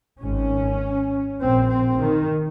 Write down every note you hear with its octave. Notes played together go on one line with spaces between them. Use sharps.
G#1 G#2 C#4
A#1 A#2 C4
C4
D#3